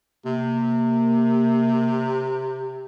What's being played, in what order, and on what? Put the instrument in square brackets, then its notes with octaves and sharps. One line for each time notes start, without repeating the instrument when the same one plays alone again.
[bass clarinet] C3 [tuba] A#3